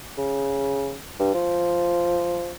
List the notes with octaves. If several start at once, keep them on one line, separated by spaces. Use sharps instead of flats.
C#3
G2
F3